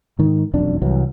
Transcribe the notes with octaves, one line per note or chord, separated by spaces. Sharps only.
G#2 D#3
E1 B1 F2 D4
C2 E3 F#3